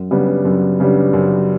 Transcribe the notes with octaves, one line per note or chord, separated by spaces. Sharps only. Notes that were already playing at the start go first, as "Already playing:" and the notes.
Already playing: F#2
C#3 G3 B3 D4
F#2
C#3 G3 B3 D4
F#2